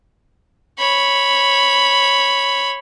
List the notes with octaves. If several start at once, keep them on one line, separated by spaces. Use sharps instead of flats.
C#5 B5